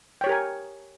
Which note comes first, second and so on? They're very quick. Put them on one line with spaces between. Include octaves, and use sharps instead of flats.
G5 C#5 G4 A#4 G#5